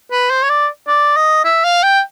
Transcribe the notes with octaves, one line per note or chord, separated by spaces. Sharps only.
B4
C5
C#5
D5
D5
D#5
E5
F5
G5